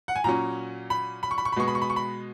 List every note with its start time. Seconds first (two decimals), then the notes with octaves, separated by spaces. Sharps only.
0.08 F#5
0.16 G#5
0.24 A#2 F#3 C#4 A#5
0.90 B5
1.23 B5
1.31 C#6
1.38 B5
1.45 C#6
1.52 B5
1.56 B2 G#3 B3 C#6
1.68 B5
1.75 C#6
1.82 B5
1.90 C#6
1.96 B5